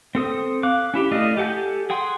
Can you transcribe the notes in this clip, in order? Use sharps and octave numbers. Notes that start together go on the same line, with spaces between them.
C4 A4 D#6
F5 D6 F#6
C#4 E4 G4
A3 E4 D5 D#5 F5
G4 A4 F#5 G#5 G6
G#4 F#5 G5 C6